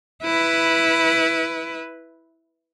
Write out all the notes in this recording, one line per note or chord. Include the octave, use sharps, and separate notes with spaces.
E4 B4